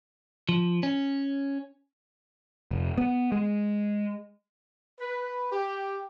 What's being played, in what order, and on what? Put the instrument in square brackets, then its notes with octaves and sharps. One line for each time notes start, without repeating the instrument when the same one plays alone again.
[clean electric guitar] F3
C#4
[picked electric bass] F1
B3
G#3
[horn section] B4
G4